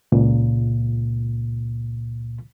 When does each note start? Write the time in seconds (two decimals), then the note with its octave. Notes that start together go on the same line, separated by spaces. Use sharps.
0.12 C#2 A#2